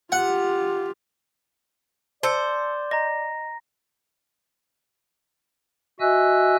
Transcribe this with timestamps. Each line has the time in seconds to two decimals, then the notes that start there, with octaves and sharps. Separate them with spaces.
0.12 F4 G4 F#5
2.23 C5 D5 A5 E6 C#7
2.91 D#5 A#5 A#6
6.00 F#4 D#5 E5 G#5 E6 F#6